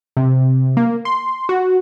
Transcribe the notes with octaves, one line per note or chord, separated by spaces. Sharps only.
C3
A#3
C6
F#4